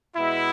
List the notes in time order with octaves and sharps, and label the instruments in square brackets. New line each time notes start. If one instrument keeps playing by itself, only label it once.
[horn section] B2 G#3 B3 E4